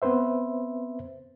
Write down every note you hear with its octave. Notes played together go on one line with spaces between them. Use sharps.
B3 C4 B4 C5 E5